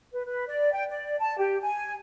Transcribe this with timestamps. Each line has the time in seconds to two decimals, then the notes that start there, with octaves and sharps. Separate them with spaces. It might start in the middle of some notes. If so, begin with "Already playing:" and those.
0.13 B4
0.26 B4
0.47 D5
0.73 G5
0.89 D5
1.19 A5
1.37 G4
1.61 G#5